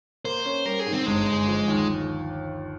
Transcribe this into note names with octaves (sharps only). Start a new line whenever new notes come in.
A#3 C5
C#4
G3 A#4
G#4
G#2
C4
G1 G#3
G1
F3
D#2